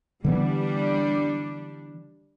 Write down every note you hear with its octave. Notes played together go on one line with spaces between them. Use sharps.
D3 E3 G3 B3 D4